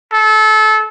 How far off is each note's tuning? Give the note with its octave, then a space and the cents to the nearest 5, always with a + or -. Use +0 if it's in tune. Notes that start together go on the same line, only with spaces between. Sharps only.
A4 -30